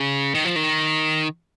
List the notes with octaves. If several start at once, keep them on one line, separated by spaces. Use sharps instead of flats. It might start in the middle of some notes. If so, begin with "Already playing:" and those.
Already playing: C#3
D#3
F3
D#3